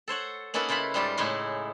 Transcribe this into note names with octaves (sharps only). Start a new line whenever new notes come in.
A4 C5 C#5 F#5
A#3 C#4 D#4 A4 B4 F#5
C#3 E4 F4 A5 B5
G#2 G3 F4 G4 A5
A2 C#3 G#3 C#4 D#4 E4